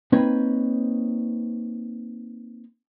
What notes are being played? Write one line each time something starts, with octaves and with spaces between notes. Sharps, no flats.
A#3 C4 D#4 B4 C#5